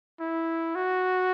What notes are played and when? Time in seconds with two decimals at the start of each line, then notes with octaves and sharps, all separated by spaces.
0.20 E4
0.75 F#4